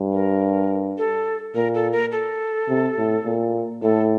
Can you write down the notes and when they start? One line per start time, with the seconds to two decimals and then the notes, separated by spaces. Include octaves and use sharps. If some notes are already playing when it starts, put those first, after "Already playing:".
Already playing: G2
0.13 A#4
0.98 A4
1.55 A#2 A#4
1.74 A4
1.92 A#4
2.12 A4
2.69 C3
2.97 A2
3.25 A#2
3.82 A2 A4